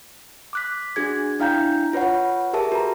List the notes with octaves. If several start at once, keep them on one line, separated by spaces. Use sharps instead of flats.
D6 F#6 B6
D4 F#4 G#4 G#6
D4 E4 F5 G5 A#5 G6
F4 B4 C#5 F#5
G4 G#4 A#4 E5 A5
F#4 B4 A#5